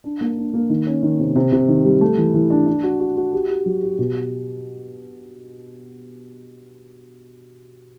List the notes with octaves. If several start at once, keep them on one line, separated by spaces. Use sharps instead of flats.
D4
A#3
D4
A#3
D#3
C#4
D#3
C3
C3
C3
D#3
G3
A3
E3
E3
D4
D4
F#4
F#4
F#4
G4
G4
F#3
G4
B2